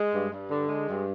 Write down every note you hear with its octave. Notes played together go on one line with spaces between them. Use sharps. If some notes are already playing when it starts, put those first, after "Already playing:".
Already playing: G#3
G2
G2
D3
G#3
G2